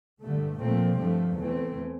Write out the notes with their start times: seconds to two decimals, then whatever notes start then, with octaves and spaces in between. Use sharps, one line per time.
0.22 G2 D3 A3
0.61 A#2 F3 A3 C4
0.99 G2 F3 A3
1.38 E2 E3 A3 C4